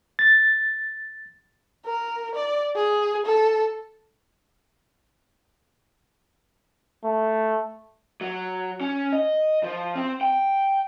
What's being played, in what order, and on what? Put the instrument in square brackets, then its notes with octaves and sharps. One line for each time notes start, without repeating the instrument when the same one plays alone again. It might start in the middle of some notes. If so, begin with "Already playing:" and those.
[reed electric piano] A6
[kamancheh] A#4
D5
G#4
A4
[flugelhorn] A3
[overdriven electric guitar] F#3
C#4
D#5
F3
C4
G5